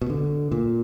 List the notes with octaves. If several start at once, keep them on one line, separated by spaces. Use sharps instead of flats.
B2
D3
A#2